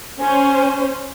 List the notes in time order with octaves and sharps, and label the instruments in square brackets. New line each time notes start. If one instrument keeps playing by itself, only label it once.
[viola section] C#4 C5 [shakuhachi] G#5